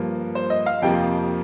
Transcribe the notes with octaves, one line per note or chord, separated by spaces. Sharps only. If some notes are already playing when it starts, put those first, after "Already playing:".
Already playing: G2 F3 A#3
C5
D#5
F5
F2 C3 F3 A#3 G5